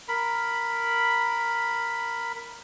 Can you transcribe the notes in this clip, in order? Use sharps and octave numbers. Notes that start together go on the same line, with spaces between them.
A#4 B5